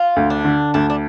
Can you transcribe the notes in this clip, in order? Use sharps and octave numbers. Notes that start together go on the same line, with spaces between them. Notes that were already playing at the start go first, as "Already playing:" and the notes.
Already playing: F4
D2
D4
D3
D2 D4
D4